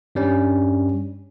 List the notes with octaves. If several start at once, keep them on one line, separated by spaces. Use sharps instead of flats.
G2 G3 C#4